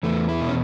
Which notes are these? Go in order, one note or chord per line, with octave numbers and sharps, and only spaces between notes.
E2 A3
E4
B2
C#4